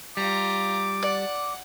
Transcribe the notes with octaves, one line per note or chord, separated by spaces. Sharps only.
G3 F4 A#5 D6
D5 F#5